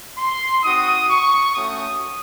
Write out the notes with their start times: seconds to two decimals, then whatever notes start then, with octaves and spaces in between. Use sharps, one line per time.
0.18 C6
0.63 C4 D#4 F#4 D#6
1.09 C#6
1.54 A3 C#4 F#4 D#6